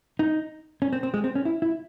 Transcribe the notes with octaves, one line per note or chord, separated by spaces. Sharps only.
D#4
C#4
C4
C4
G#3
C4
C#4
E4
E4